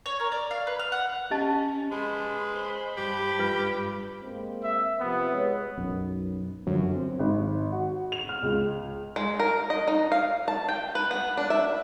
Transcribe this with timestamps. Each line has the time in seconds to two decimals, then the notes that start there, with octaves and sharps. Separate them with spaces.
0.06 C#5
0.20 A#4
0.32 D5
0.51 F5
0.67 B4
0.79 F6
0.92 F#5
1.31 C#4 G4 D#5 A5
1.92 G#3 B4 B5 C6
2.55 C5
2.97 G2 G4
3.39 F4 B4
4.22 G#3 A#3 C4
4.64 E5
5.00 C3 F3 B3
5.31 G#3 B4 C#5
5.78 B1 F#2
6.67 F#2 D3 F3
6.94 C4
7.19 G#1
7.72 F#4
8.12 F7
8.29 F6
8.43 C#2
9.16 G#3
9.40 A#4
9.70 D#5
9.88 D#4
10.12 F5
10.48 A5
10.69 G5
10.95 B4
11.11 B3
11.37 D4
11.50 E5